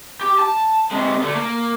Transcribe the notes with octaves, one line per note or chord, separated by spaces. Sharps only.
G4
A5
C3 G#3
D3 A3
A#3